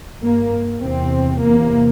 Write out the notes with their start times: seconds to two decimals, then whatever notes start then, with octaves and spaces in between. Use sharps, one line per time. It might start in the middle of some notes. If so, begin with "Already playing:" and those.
0.22 G2 A#3
0.82 E2 C3 C4
1.41 E2 C3 A#3